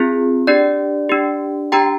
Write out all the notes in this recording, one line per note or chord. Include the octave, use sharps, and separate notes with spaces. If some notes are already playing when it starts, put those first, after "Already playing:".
Already playing: C4 F4 G#4
D4 G4 D5
D4 G4
D4 G4 G5 A#5